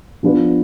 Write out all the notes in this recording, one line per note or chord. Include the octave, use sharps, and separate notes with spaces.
F3 B3 D4 F4 B4